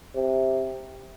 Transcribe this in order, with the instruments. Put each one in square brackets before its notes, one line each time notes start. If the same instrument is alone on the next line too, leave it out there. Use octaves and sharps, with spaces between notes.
[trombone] C3